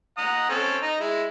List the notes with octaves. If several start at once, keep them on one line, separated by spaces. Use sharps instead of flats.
F#5 A#5 D#6
C4 C#4 A4
D#4 A#5
G#3 E4